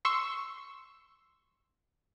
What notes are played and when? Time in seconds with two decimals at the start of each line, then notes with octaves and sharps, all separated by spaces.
0.05 C6 C#6 E6